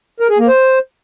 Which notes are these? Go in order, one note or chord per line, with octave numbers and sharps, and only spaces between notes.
A#4
G#4
A#3
C5